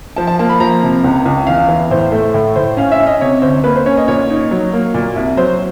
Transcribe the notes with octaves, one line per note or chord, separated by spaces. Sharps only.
F3 A5
A5
A#3 A5
B5
F3 A#5
C3
C#2
C#2
E2 F5
E3
A2 C5
A3
A2
A2 C5
C#4 F5
E5
C#4
D#5
C3 C#5
D2 C5
A#3 B4
C5
C#4 C#5
D#5
A#2 C#5
D#4
F#3
A#3
A#2
C2
F#3 C5